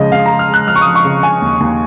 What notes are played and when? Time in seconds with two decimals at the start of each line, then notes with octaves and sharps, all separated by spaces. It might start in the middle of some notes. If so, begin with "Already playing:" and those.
Already playing: C#3 F3 G#3 D#5
0.12 C#3 F5
0.26 G#3 A#5
0.39 F6
0.49 G#3
0.54 F#6
0.67 F3 F6
0.76 C#6
0.81 D#6
0.86 F3
0.95 C#6
1.04 C#3
1.23 C#3 G#5
1.42 D#2
1.60 D#2